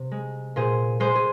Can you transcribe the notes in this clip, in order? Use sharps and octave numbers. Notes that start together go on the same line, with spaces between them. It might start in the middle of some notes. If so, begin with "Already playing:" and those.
Already playing: C3
G#3
A#2 G#4 C5
G#3 G#4 C5
G#4